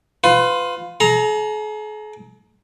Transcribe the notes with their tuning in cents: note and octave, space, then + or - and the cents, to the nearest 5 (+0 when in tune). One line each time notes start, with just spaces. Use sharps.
F4 +10 B4 +30
G#4 +45 A#5 +0